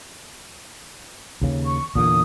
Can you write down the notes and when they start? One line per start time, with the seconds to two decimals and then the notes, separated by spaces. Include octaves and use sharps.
1.42 D#2 C#3
1.66 C#6
1.96 E2 A#2 D3 D#6